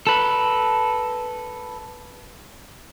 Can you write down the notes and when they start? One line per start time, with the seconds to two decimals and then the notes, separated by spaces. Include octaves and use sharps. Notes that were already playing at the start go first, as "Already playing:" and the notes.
0.07 A4 B4